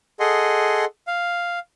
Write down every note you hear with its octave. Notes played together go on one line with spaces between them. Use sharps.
G#4 A4 D#5 F#5 C6
F5